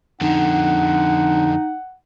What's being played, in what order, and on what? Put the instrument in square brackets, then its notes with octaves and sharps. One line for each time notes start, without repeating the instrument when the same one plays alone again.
[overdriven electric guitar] F2 D3 [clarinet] D#4 [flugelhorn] F#5